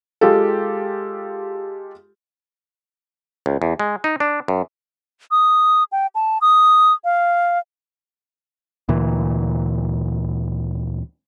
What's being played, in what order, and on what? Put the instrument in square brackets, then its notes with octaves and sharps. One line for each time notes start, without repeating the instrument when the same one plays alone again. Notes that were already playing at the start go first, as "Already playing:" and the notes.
[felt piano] G#3 F4 G4 A4
[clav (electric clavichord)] C#2
E2
G#3
D#4
D4
F#2
[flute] D#6
G5
A5
D#6
F5
[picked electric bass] D2 A#2 E3